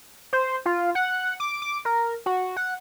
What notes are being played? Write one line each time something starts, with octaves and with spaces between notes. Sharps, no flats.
C5
F4
F#5
D6
D6
A#4
F#4
F#5